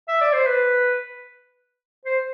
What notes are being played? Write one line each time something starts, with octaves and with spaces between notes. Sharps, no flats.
E5
D5
C5
B4
C5